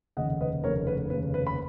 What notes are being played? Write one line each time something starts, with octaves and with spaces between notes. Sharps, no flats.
F1 D#2 C#3 D#5 F#5
B4 D#5
F1 D#2 C#3 A#4 C#5
B4
F1 D#2 C#3 B4
B4
B5